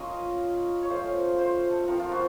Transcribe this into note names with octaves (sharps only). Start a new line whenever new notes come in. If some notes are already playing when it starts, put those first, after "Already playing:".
Already playing: A#3 C#4 F4 D#5
C#5
A3 C#4 F4 C5
C5
A4
F3 C4 F4 A#4
F4
F#4